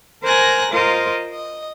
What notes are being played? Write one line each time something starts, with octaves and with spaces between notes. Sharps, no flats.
A#4 C5 G#5 A#5 F#6 A#6
F4 A#4 C5 D#5
D#5